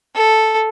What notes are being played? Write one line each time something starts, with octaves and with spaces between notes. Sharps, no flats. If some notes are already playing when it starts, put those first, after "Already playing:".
A4